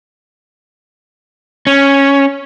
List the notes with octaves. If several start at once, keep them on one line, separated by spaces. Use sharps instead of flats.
C#4